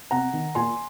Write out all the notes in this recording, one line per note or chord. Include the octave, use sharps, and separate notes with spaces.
C3 F#5 A#5
D#3
A#2 G#5 C6